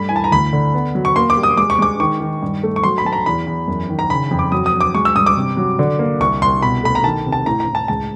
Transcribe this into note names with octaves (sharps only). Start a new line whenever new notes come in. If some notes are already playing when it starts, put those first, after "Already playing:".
Already playing: G2 A3 B5
E3 G#5
A5
A#5
D2 B5
D3
B3
F#3
C#6
A#3 C6
D6
G3
D#6
G#3 D6
C#6
G#3 D6
D#3 C#6
D#3
G2
A3
C#6
F#3 C6
B5
F#3 A5
A#5
E2 B5
E2
F#2
D#3
A#5
C#3 B5
F2
D6
F#3 D#6
D#6
F#3
D6
G#3 C#6
E6
G2 D#6
D6
C3
F#3
D3
A#3
C2 C#6
C2 C6
B2 B5
A3 B5
A#5
D#3 A5
C3
A5
A2 A#5
A#5
A2
A5
C#2 A5